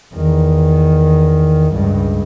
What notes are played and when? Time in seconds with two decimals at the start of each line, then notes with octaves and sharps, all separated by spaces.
0.14 E2 D#3
1.74 C#2 G2